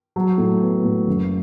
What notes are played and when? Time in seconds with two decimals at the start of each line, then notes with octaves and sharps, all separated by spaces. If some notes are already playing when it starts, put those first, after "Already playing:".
0.16 F#3
0.38 A2
0.61 B3
0.84 A2
1.07 F#1